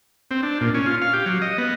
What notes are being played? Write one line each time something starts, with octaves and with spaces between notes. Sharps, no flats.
C4
D4
A#2
C#4
F4
F5
G4
F#3
D#5
B3